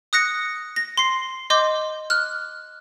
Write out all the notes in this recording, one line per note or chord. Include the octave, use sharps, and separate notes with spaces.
D#6 F#6 A#6 C#7
A#6
C6 C7
D#5 C6 D6 G6
F6 F#6